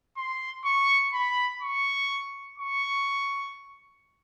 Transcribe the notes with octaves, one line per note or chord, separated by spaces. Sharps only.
C6
C#6
B5
C#6
C#6